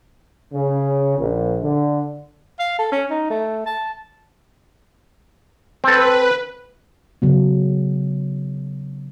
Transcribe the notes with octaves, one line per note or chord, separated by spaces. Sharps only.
C#3
A#1
D3
F5
A4
C#4
D#4
A3
A5
C4 A4 B4
C#3 F#3 B3